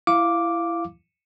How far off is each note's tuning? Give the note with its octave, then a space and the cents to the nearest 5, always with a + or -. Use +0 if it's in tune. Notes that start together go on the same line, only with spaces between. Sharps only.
E4 +20 F5 +0 D6 +0